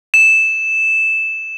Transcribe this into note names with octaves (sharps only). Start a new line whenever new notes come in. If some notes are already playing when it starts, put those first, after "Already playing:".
E7